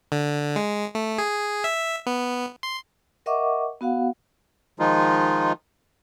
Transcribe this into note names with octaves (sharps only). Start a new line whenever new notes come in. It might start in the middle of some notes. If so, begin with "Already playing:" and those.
D3
G#3
A3
G#4
E5
B3
C6
A#4 D#5 E5 F#5 C#6 D6
B3 F#4 F5 F#5
D#3 F3 G#3 D#4 F4